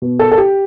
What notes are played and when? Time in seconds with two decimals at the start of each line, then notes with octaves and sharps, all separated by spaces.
0.02 B2
0.19 A4
0.31 A4
0.38 G4